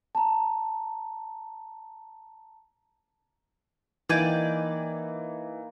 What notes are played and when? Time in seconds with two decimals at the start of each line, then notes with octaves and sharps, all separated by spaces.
0.15 A5 A#5
4.09 E3 A#3 D#4 D5 G5 G#5